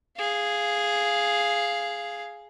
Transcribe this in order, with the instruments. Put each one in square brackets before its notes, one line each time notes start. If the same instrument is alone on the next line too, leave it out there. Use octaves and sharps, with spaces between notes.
[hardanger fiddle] G#4 F5